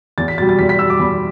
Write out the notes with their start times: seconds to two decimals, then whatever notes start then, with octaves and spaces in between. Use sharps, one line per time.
0.18 E2 A6
0.28 B6
0.38 B2 G3 A6
0.49 A6
0.59 E2 B6
0.69 B6
0.79 B2 G3 E6
0.90 D6
0.99 E2 B5